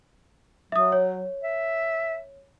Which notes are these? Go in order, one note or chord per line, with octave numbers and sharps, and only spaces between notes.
F#3 E5 D#6
C#5
E5